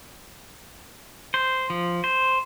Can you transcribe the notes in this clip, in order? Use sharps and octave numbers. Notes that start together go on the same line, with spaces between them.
C5
F3
C5